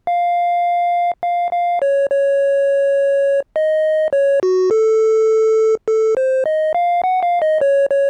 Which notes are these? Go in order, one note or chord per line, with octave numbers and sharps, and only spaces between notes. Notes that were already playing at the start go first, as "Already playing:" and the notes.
F5
F5
F5
C#5
C#5
D#5
C#5
F#4
A4
A4
C5
D#5
F5
F#5
F5
D#5
C#5
C#5